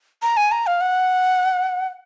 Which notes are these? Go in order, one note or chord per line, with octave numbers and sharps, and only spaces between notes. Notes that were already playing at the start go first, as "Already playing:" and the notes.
A#5
G#5
A#5
F5
F#5